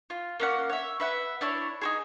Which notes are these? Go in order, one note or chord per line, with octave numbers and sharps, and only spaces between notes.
F4
A#3 C#4 F#5
C#5 E5
B4 E5 F#5
D4 E4 C#5
D#4 F#4 G#4